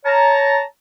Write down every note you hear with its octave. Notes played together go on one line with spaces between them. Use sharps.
C#5 A5 A#5